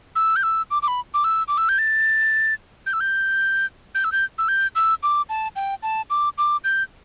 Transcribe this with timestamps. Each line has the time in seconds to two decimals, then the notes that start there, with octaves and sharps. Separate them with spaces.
0.16 E6
0.36 G6
0.43 E6
0.71 D6
0.82 D6
0.88 B5
1.14 D6
1.24 E6
1.48 D6
1.58 E6
1.69 G6
1.78 A6
2.86 G6
2.93 E6
3.00 G6
3.95 G6
4.04 E6
4.12 G6
4.38 E6
4.48 G6
4.75 E6
5.03 D6
5.29 A5
5.56 G5
5.83 A5
6.10 D6
6.38 D6
6.64 G6